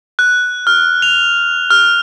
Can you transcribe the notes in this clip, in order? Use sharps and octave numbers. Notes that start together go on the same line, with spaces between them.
F#6
F6
F7
F6